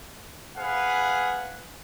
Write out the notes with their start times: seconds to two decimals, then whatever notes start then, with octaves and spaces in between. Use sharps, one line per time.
0.58 G#4 B4 F5 F#5